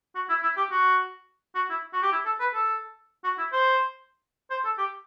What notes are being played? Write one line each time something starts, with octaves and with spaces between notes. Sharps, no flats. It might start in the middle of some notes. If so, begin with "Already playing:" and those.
F#4
E4
E4
G4
F#4
F#4
E4
F#4
G4
E4
A4
B4
A4
F#4
E4
C5
C5
A4
G4